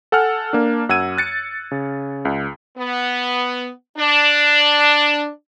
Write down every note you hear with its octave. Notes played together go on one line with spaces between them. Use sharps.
A4 F#5 G#5 F6
A#3 D4
F#2 F#5 E6 G#6 D#7
F#6 A6 C#7
C#3
C#2
B3
D4